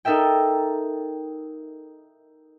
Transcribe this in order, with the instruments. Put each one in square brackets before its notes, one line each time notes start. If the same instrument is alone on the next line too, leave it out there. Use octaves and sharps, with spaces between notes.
[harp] D#4 A4 A#4 E5 G5